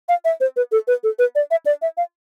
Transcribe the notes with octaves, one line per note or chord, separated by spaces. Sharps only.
F5
E5
C5
B4
A4
B4
A4
B4
D5
E5
D5
E5
F5